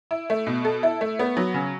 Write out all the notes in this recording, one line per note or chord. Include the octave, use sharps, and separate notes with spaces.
E4
A3
B2
A4
E4
A3
B3
F#3
C#3